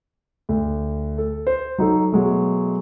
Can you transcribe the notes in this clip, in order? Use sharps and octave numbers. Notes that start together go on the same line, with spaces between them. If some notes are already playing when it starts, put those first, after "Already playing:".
D2
A4
C5
F#3 D#4 A4
B2 F#3 G#3 A3